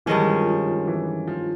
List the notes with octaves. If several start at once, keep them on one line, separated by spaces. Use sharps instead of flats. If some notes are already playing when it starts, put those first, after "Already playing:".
G2 D#3 E3 G#3 C#4
F3
F3
F3
E3
F3